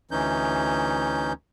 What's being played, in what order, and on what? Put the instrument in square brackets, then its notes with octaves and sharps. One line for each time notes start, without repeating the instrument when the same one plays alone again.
[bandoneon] D2 E3 C#4 D#4 G6